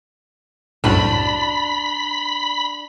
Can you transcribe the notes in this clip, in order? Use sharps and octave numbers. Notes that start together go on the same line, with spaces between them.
C2 F#2 A2 D4 B5